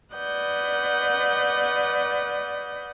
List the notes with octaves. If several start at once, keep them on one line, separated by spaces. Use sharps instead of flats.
B4 D5 D#5 F#5 G6